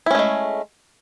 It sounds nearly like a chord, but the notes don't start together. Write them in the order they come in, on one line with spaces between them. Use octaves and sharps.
E4 C#4 A3 G#3